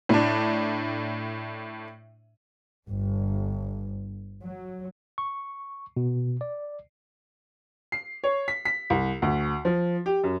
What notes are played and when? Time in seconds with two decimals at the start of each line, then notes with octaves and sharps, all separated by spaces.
0.09 A2 D4
2.87 G1
4.42 F#3
5.18 C#6
5.97 B2
6.41 D5
7.92 C7
8.24 C#5
8.48 B6
8.65 B6
8.90 C2
9.22 D2
9.65 F3
10.06 G4
10.24 F#2